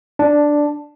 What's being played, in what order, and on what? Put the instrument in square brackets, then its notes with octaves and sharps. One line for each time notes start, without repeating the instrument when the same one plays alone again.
[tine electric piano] D4